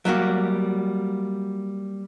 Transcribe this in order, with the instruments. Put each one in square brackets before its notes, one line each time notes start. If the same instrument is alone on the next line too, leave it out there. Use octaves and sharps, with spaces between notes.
[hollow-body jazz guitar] F#3 G3 A#3 F#4